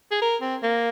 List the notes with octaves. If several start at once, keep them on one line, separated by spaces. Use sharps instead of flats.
G#4
A#4
C4
A#3